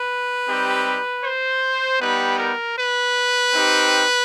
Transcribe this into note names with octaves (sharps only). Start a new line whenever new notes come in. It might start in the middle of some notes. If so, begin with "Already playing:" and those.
Already playing: B4
G3 C4 D#4 G4
C5
G3 B3 D#4 G4 B4
A#4
B4
C4 D#4 G4